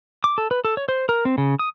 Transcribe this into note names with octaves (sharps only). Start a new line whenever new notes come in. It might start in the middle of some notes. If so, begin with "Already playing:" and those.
D6
A4
B4
A4
C#5
C5
A#4
C4
C#3
D#6